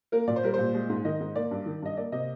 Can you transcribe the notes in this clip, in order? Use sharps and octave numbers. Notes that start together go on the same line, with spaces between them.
A#3 A#4
A#2 D5
C5
G3 A#4
A#2 C5
G#3
G#2
D#3 D#5
G#2
A#3 D5
G2
D#3
G2 D#5
A#3 D5
C3 D#5